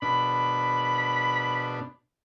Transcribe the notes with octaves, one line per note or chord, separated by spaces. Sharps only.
B2 D4 B5